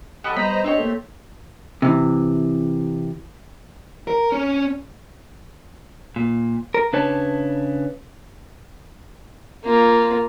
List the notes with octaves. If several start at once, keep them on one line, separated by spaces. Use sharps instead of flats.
F#3 F#4 G4 A4 D#5 B5
G3 B3 C5 D#5 A#5 B5
C4 D4 G4 C#5 D#5
A3 A#3 A4
C3 E3
A#4
C#4
A#2
A#4
C#3 D4 B4 C#5 A5
A#3 F4